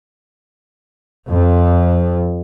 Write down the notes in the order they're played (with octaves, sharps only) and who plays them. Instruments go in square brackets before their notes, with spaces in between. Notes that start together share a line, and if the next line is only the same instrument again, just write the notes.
[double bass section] F2